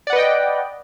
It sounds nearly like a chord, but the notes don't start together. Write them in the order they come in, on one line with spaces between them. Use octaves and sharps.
D5 F#5 B4 D#5 G5